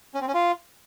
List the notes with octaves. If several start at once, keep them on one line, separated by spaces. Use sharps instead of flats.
C#4
C4
C#4
F4